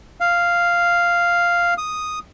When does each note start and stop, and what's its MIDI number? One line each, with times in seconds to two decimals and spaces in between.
0.21 1.74 77
1.78 2.19 87